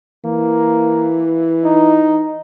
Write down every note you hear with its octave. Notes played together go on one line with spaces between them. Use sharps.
E3 A#3
D#4